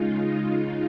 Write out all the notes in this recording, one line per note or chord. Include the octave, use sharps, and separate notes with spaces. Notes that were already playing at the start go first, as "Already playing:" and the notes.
Already playing: C#3 G#3 D#4 F4
D#4